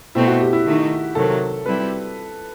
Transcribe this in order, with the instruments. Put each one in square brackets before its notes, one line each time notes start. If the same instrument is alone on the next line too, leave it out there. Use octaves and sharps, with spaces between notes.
[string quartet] B2 A3 C4 [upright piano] E4
[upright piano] F#4
G4
E4
[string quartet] D#3 A3 D#4
[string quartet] C3 D#3 F#3 A3 [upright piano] A4
[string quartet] G3 C4 E4 G4 [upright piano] B4